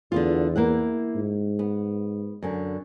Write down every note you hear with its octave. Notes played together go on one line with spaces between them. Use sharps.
E2 D3 B3 F4
A#3 E4 F#5
G#2
B3
F#2 D3